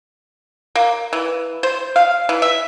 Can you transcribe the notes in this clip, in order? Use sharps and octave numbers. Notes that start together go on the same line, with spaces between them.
A#3
E3
C5
F5
E3
E5